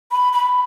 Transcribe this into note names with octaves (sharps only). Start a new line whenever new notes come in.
B5
B5